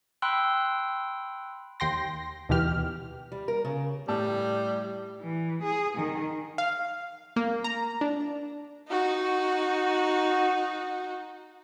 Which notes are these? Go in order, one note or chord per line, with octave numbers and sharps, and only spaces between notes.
G5 B5 C6 E6 F#6
D#2 G5 C6 A#6
D#2 B2 E3 G4 F6
G3
A#4
C#3
A2 G3 A5 E6
E3
G#4
D#3
F5
A#3
A#5
D4
D#4 F#4